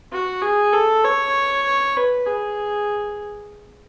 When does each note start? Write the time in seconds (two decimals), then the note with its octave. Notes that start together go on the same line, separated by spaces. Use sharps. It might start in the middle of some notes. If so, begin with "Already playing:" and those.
0.12 F#4
0.42 G#4
0.73 A4
1.04 C#5
1.96 B4
2.26 G#4